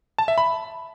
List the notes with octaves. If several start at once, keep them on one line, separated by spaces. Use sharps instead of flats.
A5
E5
B5